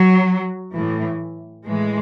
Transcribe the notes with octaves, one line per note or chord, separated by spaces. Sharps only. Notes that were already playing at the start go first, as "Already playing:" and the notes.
Already playing: F#3
A2 E3
A2 E3 G#3